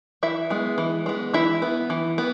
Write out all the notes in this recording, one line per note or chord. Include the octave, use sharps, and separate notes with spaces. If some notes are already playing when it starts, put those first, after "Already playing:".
E3 E4 E5
G#3 B3
E3
G#3 B3
E3 E4 E5
B3
E3
B3